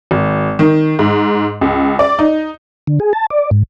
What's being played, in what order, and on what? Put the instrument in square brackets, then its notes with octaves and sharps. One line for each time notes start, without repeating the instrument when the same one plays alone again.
[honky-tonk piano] G#1
D#3
G#2
C#2
D5
D#4
[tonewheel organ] D3
G#4
A5
D5
G#2